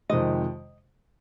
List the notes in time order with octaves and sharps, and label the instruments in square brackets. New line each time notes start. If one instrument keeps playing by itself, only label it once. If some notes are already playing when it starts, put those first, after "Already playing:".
[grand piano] F2 C3 D#3 G#3 [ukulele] D#5